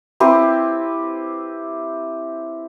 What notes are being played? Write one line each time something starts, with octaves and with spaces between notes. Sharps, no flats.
C4 E4 G4 B4